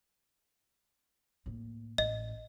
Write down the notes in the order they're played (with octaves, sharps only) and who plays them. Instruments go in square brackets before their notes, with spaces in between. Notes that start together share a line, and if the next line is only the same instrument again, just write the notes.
[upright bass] A2 A#3
[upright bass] A1 [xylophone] D#5